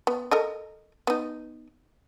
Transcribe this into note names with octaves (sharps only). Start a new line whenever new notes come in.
B3
A4 A#4 D#5
B3 D#4